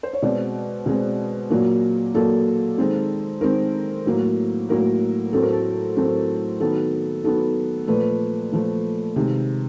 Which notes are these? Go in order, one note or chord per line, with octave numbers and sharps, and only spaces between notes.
C5
C#5
B2 G#3 C4 D5
B2 G#3 C4 G#4
A#2 F#3 A#3
A#2 F#3 A#3 A4
D#3 G#3 C4
D#3 G#3 C4 A#4
A2 F#3 A#3
A2 F#3 A#3 A#4
A2 F#3 A3 C4 A4
A#4
A4
A2 F#3 A3 C4
D#3 F#3 B3 A4
D#3 F#3 B3 A4
A#2 F3 A3 B4
A#2 F3 A3
C3 D#3 G#3